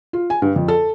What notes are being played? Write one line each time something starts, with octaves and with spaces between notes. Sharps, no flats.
F4
G#5
G2
F2
A4